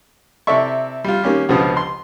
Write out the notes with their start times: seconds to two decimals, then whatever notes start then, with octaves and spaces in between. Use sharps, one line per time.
0.47 C3 E4 A4 D5 E5 C#6
1.04 G3 F4
1.23 D#3 A#3 C#4 G4
1.49 C#2 B2 D3 F3 B3
1.77 C6